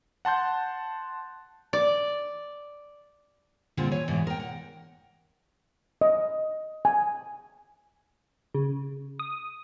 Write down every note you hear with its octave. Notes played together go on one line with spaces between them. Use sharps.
F#5 A5 C6 G6
D5
A#2 D3 G3 C4 F4 G#4
E3 C#5 G#5
G#2 B2 E3 G#3 D5
A#4 G5
F#5
D#5
G#5
C#3
D#6